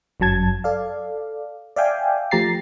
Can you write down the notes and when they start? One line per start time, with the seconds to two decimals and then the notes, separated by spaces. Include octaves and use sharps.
0.20 G1 F#2 F#3 A5 G#6
0.64 A4 D5 F5
1.76 D5 E5 F5 G5 G#5
2.31 F3 A3 G4 A#5 A6 C7